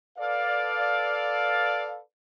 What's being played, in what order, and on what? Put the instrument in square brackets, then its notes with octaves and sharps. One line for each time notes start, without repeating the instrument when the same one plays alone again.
[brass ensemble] A4 B4 D5 F5